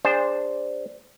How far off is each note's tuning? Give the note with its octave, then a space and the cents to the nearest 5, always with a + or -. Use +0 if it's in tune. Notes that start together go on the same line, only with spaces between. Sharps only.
D4 +0 G#4 -35 C5 +0